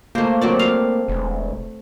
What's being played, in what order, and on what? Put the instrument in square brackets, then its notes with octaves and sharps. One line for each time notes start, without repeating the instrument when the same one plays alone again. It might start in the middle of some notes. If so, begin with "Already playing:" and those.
[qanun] A3 C5 [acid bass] A#3
[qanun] F#3 C4 D5
F5
[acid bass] E1